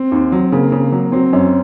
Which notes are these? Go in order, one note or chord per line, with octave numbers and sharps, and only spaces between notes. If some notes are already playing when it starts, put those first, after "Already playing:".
Already playing: C4
D#2
F#3
C#3 A#3
C#3
F#3
F#3 C4
F#2 C#4